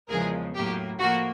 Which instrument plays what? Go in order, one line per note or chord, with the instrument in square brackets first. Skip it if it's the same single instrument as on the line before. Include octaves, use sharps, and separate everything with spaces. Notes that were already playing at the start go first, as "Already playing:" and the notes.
[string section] E2 C#3 F3 G#3 G#4 A#4
A2 F#3 A#3 G4
A2 F3 A#3 F#4